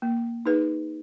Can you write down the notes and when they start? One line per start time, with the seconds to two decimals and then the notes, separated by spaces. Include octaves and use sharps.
0.02 A#3
0.46 D#4 G#4 B4